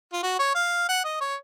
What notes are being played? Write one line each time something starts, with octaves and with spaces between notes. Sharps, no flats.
F4
F#4
C#5
F5
F#5
D#5
C#5